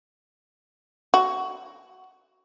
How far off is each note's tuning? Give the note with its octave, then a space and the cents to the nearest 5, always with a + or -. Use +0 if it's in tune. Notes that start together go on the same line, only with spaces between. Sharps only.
F#4 +15